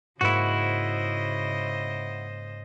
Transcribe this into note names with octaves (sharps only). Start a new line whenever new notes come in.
G#2 C#3 A#3 E4 F#4 C5 D#5 C#7